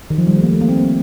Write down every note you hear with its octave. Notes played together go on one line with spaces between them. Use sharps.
D#3
F3
G3
A3
A#3
A3
A#3
C4
A#3